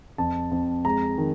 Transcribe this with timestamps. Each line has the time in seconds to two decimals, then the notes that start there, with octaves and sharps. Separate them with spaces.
0.18 F2 A5
0.51 F2
0.85 G#3 A#5
1.18 D#3